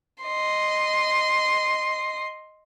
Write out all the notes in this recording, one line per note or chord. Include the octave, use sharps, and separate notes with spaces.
D#5 C6